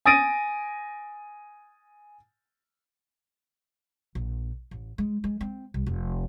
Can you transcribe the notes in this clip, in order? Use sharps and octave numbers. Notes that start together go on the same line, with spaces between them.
G#5 D#6 A6 A#6 D7 D#7
A#1
A1
G#3
G#3
C4
C2
F1